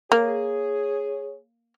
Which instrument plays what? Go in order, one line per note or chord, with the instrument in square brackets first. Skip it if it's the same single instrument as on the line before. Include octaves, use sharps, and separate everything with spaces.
[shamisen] A#3 [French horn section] G#4 C#5